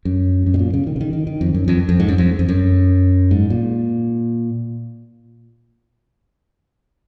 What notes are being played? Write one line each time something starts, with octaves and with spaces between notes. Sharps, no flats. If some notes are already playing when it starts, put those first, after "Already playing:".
F#2
F#2
B2
A#2
C#3
D#3
C#3
D#3
D#3
D#3
F2
F#2
F2
F2
G#2
F#2
F2
F2
F#2
G#2
A#2